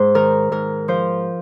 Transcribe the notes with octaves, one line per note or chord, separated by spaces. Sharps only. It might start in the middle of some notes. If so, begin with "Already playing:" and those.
Already playing: G#2 C5
D#3 A#4
G#2 A#4
F3 C5